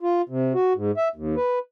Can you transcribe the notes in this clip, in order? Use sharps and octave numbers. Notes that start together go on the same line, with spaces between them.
F4
C3
F#4
G#2
E5
D#2
B4